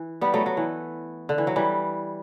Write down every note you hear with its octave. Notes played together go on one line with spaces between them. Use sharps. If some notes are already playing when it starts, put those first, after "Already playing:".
Already playing: E3
G3 B3
F#3 A3
F#3
E3
D3
E3
F#3
E3 G3